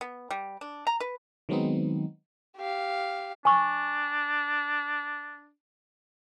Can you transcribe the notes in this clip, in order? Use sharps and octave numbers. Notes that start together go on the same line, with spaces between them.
B3
G3
D4
A#5
B4
D#3 F#3 G#3 B3 C4 D#4
G4 F5
D4 G#5 C#6